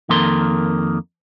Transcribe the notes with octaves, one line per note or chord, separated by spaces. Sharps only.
F2 D#3 A#3 A4 A#4 C6